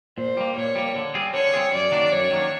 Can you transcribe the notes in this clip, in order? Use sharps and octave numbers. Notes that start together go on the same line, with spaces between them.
A#2 C5
G3 A#3
A#2 C#5
G3 A#3
D3
G3 C4 F4 G#4
D3 C#5
G3 C4 F4 G#4
F#2 D5
D#3 F#3 A#3 D4
F#2 C#5
D#3 F#3 A#3 D4